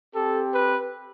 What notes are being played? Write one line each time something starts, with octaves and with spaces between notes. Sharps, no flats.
C4 G4 A4
B4